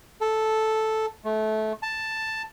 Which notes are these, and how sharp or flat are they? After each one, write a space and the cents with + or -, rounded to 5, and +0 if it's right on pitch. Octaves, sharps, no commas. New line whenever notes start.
A4 -5
A3 -20
A5 +5